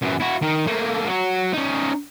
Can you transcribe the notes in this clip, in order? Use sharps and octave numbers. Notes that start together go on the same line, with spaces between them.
F#2 E3
E4 F#4
D#3
A3 A#3
F#3 F#4
C#4 D#4